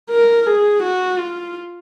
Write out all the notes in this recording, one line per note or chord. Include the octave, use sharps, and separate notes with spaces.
A#4
G#4
F#4
F4